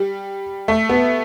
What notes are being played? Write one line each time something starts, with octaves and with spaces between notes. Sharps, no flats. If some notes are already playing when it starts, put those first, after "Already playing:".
Already playing: G3
A3
B3